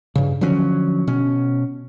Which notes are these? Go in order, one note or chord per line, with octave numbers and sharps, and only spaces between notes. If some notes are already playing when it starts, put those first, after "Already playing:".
G2 C#3
D3 F3 F#3 C#4
B2 C#4